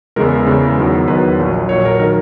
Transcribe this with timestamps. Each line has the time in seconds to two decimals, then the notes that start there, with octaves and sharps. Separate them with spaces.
0.16 E2 C#3 E3 G#3 A#4
0.46 E2 C#3 E3 G#3
0.78 E2 D#3 F#3
1.08 E2 D#3 F#3 B4
1.39 A#1 A#2 F#3
1.69 A#1 A#2 F#3 C#5
1.85 A#4
1.99 D#3 F#3 A#4